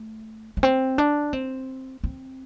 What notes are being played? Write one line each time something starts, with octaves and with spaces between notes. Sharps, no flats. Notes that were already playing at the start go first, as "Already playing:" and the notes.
Already playing: A3
A3
C4
D4
C4
C4